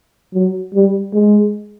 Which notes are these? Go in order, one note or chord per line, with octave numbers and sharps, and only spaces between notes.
F#3
G3
G#3